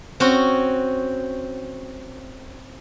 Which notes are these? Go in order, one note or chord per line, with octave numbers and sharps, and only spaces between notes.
C4 C#4 F#4